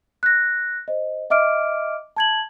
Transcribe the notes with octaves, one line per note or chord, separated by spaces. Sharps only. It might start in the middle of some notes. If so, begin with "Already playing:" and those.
F#6 A#6
C5 D#5
D#5 E5 D6 F6 D7
A5 G#6 F#7